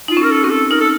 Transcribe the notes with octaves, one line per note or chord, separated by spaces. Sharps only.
D#4 F4
C#4
A#4
A4
C4 F#4
A4
D#4 A#4
A4